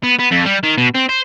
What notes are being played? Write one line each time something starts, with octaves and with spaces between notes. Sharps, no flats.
B3
B3
F2
G3
D#3
B2
C4
C5